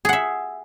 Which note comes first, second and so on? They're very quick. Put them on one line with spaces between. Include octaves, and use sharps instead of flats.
G#4 F#5 E5